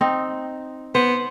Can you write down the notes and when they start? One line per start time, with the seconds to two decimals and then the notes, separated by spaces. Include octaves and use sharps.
0.01 C4 D#4
0.95 B3 C5